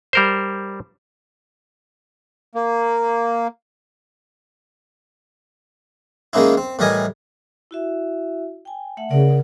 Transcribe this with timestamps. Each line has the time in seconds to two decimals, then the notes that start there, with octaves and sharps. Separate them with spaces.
0.13 G3 A#4 C5
2.55 A#3
6.33 D#3 G#3 A#3 C#4 D#4 E4
6.57 C4
6.79 A2 E3 G3 A#4 D#5 G#5
7.71 E4 F#4 E5
8.65 G5 G#5
8.97 A3 E5 F#5
9.11 C#3 A#4 D5 F#5